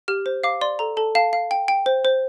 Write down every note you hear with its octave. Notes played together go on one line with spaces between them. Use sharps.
G4 F6
C5
F5 D6
D5 C6
A4 A#5
A4 A5
F5 A5
F5
G5
G5
C5
C5